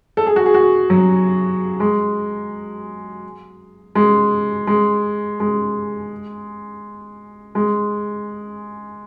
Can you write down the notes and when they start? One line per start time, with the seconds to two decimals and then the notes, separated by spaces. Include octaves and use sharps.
0.17 A4
0.27 G#4
0.36 F#4
0.46 G#4
0.54 F#4
0.90 F#3
1.80 G#3
3.95 G#3
4.67 G#3
5.40 G#3
7.55 G#3